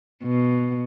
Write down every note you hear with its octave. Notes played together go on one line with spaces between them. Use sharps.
B2